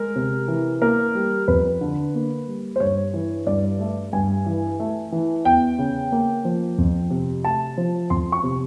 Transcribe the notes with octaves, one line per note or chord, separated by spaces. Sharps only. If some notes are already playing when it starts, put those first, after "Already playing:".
Already playing: G#3 A#4
C3
E3
A#3 A#4
G3
F2 B4
D3
A#3
G3
C5
G2 C#5
E3
G2 D5
A3
G2 G#5
E3
A3
E3
E2 G5
C#3
A#3
F3
F2
C3
A3 A5
F3
F2 C6
C#6
C3